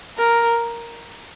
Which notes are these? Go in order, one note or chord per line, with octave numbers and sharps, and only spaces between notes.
A#4